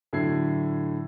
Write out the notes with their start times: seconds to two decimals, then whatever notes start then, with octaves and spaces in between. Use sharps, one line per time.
0.13 A2 D3 F#3 G#6 C7